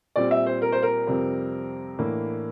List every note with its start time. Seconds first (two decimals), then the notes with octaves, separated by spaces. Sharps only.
0.16 A#2 G3 C4 D5
0.31 E5
0.46 C5
0.62 A#4
0.72 C5
0.83 A#4
1.07 F2 C3 G3 C4
1.98 A2 E3 A#3 D4